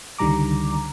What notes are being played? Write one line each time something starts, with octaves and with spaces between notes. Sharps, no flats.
C#2 D3 D#3 G3 A#5 D6